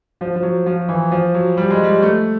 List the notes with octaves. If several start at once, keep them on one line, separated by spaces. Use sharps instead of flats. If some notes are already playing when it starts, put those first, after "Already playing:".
F3
F3
F#3
F3
E3
F3
F#3
G3
G#3
G3
A3